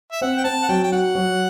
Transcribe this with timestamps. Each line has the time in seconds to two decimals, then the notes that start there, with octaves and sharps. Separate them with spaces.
0.12 E5
0.21 C4 F#5
0.37 G5
0.44 C4 A5
0.63 F#5
0.69 F#3 G5
0.83 G5
0.92 F#4 F#5
1.15 F#3